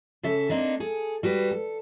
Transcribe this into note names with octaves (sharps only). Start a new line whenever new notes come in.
C#3 A4 E5
A#3 C4 D4 D#4
G#4 A4
G3 F#4 B4
A4